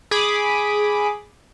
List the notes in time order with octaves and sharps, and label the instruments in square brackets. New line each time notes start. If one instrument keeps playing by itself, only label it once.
[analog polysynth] G#4 B5 D6 D#6